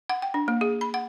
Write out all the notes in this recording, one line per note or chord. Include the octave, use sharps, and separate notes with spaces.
F#5
G5
D4
A#3
G#4
B5
F#5